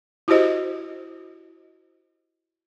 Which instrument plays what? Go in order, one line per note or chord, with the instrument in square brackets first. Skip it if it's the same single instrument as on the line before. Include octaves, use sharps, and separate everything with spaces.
[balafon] E4 F#4 G4 C5 D#5